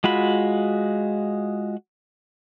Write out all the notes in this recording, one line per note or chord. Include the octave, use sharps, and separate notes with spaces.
G#3 F4 F#4 B5